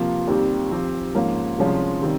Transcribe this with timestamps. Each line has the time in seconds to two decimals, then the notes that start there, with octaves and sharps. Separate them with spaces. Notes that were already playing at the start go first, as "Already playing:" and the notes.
Already playing: C3 F3 A#3 F4
0.28 D#2 D#3 G3 C4 G4
0.71 F3 C4 G4
1.14 G#2 F3 A#3 C#4
1.58 C2 C3 F3 G#3 C#4
2.02 D#3 G3 C4